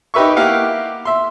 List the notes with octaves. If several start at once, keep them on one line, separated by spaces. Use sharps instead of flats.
D#4 G4 B4 E5 C#6
A#3 E4 G4 F5 F#5
E5 C6